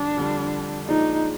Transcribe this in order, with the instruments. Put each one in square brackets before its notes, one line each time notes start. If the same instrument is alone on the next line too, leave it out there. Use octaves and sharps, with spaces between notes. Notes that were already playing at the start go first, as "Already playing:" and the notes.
Already playing: [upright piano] F2 D3 G3 [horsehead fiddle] D4
[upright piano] F2 D3 G3
[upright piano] A#2 F3 G#3 D4 [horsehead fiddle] D#4